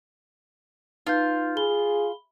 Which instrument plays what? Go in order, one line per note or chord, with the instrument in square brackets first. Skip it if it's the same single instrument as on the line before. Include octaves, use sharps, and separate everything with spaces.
[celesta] D#4 B4 G6 [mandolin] F4
[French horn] G#4 [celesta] B5 G7